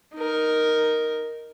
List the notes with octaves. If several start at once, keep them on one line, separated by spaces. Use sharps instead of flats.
D#4 A#4